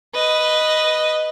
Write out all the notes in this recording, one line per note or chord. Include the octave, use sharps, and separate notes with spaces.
B4 D#5